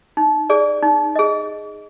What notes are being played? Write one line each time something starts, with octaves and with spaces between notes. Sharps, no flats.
D#4
G#4 D5
D#4
G#4 D#5